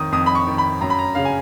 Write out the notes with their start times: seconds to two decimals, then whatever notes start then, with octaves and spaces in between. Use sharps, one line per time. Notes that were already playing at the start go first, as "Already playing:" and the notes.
Already playing: F2 D#3 D#6
0.12 F2 D#6
0.26 B5
0.35 C#6
0.47 D#3
0.58 B5
0.81 F#2 A#5
0.90 B5
0.99 A#5
1.15 C#3 F5
1.25 G#5